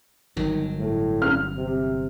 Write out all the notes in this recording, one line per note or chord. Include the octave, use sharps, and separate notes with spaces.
G1 D#3 F#3
A2
F6
C3